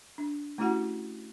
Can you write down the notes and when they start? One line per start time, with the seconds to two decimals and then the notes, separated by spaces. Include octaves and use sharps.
0.18 D4
0.58 A3 C#4 E4 F#4 G4 F#5